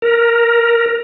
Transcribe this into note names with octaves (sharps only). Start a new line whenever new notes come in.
A#4